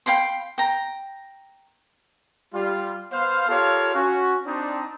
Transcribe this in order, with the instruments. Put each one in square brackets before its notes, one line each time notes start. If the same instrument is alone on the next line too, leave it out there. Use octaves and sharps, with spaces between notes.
[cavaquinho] F5 G5 B5 C6
G5 A#5
[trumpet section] G3 F4
B3 C5 F5
F4 G4 A4 A#4 C#5 F5
C#4 F#4
C4 D4 D#4